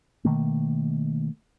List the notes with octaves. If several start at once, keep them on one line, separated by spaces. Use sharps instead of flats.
B2 D#3 A3 A#3